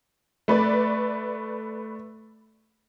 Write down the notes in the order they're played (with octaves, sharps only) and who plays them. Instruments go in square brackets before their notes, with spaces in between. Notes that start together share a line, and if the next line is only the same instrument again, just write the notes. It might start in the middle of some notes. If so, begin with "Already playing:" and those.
[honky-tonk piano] A3 B4 D5